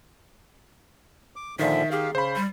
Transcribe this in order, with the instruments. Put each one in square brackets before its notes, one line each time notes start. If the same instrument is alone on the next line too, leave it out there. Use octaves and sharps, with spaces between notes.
[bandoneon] D6
[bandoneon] A#2 D3 F3 [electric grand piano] D#3 [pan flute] E5
[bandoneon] G4 F5 [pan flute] G#4
[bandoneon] C#3 [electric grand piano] C5 B5
[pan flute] G3